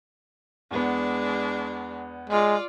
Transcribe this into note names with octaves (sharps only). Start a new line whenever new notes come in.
E2 G#3 B3 D4
G#3 F4 D5